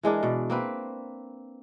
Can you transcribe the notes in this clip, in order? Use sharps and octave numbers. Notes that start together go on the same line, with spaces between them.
E3 G#3 D4 A#4
B2 D5
A#3 C4 B4